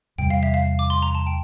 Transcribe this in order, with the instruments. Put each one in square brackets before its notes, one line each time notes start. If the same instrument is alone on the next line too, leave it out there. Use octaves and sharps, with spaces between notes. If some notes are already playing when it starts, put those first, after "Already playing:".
[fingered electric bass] E2 C3 G3 [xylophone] G5
[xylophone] F5
E5
F5
D6
C6
A#5
A5
G5